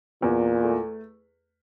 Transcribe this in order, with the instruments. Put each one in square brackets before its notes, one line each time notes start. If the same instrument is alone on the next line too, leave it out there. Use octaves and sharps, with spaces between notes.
[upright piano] E2 [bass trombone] A#2
[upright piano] A3